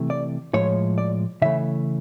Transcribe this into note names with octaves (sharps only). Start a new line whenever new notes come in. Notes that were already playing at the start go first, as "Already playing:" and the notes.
Already playing: C3 E3 A3
D5
A2 F3 G#3 C#5
D5
C#3 E3 A3 E5